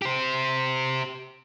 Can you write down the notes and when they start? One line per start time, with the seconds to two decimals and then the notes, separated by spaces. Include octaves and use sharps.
0.02 G4 C5